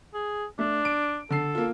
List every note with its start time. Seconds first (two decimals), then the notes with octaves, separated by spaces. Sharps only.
0.14 G#4
0.59 A3 D4
0.85 D7
1.30 D3 A4 C7
1.55 A#3 F4